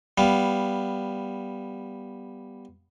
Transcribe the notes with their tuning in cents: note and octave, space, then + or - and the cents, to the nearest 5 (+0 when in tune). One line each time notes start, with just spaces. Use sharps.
G3 +0 B3 +0 F5 +0